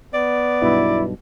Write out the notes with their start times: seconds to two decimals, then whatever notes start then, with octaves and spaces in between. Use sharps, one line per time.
0.14 B3 D5
0.62 B1 G2 B2 E4